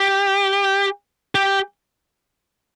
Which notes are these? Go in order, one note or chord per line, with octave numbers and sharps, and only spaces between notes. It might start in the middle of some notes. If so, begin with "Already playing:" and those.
Already playing: G4
G4